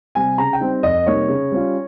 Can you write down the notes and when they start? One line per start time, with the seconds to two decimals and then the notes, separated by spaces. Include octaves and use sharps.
0.15 C3 G3 C4 G#5
0.38 C#3 A#5
0.53 G5
0.60 G3 C4 D#4
0.83 F2 D#5
1.06 C3 G3 A#3 D#4 C#5
1.29 C#3
1.52 G3 C#4 F4